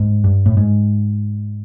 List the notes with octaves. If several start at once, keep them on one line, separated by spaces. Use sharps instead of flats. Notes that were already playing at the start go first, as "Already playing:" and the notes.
Already playing: G#2
G2
A2
G#2